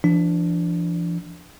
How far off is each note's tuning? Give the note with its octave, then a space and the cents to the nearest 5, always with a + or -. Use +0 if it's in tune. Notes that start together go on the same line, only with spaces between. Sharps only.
F3 -45 D4 +0